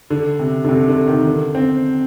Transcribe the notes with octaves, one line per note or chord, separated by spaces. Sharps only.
D3
C3
D3
C3
D3
D#3
D3
C4